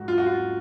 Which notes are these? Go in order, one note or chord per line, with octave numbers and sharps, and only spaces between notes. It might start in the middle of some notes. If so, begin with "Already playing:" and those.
Already playing: G#2 F#3 F#4
F4
F#4
F4